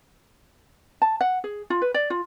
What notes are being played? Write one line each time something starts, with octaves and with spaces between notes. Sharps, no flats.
A5
F#5
G#4
F4
B4
D5
F4